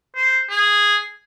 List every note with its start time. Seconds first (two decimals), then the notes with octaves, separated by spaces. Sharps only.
0.16 C5
0.49 G#4